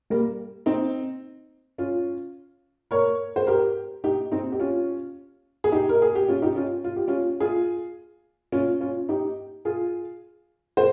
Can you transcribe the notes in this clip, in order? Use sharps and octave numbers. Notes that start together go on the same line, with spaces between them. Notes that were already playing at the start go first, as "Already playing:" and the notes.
G3 A#3
C4 D#4
C#4 F4
A#4 C#5
C5
G4 A#4
D#4 G4
C4 D#4
G4
C#4 F4
G#4
D#4 G4
A#4
G#4
G4
C#4 F4
D#4 G4
C#4 F4
F4
G4
C#4 F4
F4 G#4
C#4 F4
C#4 F4
D#4 G4
F4 G#4
C5